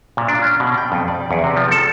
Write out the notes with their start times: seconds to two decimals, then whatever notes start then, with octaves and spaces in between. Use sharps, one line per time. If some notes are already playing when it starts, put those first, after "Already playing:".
0.17 A#2
0.28 D4
0.42 C#4
0.60 B2
0.78 G5
0.92 F2
1.08 D5
1.31 E2
1.44 C3
1.57 F3
1.71 A4